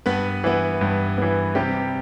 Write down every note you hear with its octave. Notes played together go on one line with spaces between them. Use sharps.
G2 B3 B4
E3 B3
G2
E3 B3
C3 G3 G4